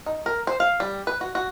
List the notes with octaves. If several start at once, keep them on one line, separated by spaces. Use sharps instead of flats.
D#4
A#4
C5
F5
G3
B4
F#4
F#4